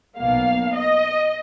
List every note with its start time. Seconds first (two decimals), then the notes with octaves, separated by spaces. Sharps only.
0.17 B1 B2 A#3 F5
0.76 D#5